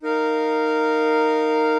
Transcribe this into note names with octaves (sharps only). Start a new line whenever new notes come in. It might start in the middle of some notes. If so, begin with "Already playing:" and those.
D#4 A#4 F5